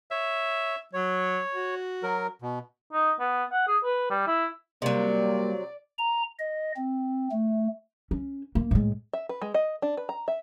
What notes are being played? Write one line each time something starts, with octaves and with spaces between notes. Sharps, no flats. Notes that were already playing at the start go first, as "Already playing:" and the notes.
C#5 E5
F#3 C#5
F#4
F#3 A#4
B2
D#4
B3
F#5
G#4
B4
G3
E4
C3 F#3 G3 A#3 D5
A#5
D#5
C4
A3
C#4
A#3
A2 G#3
E5
B4
G#3
D#5
D4
B4
A#5
E5